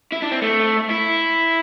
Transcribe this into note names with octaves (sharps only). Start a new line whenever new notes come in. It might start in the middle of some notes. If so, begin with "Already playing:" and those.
E4
D4
C4
A3
E4